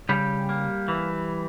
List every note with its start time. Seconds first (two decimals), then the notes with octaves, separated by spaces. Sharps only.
0.09 C#3 G3 G4
0.49 A#3
0.88 E3